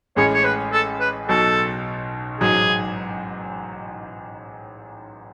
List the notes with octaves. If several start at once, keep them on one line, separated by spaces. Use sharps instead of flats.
A1 A2 G#3 C#4 G#4 C#5
C#5
B4
A4
B4
B1 B2 F#3 A4
A1 G#2 F#3 G#4